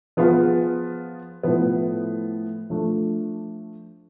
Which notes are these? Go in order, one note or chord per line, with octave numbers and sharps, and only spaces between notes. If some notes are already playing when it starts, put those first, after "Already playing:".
F3 B3 F4 G#4
A2 F3 B3
F3 A3 D4